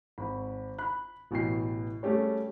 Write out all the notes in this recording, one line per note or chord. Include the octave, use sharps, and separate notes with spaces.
G#1 B5
B5 F#6
A1 B2 E3 G5 C7
G3 A3 C#4 G4 G#4 C#5